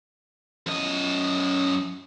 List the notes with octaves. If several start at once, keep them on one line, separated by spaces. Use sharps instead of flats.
F#2 D#5